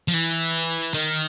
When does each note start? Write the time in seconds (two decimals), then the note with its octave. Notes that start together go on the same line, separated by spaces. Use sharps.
0.08 F3
0.14 E3
0.94 D#3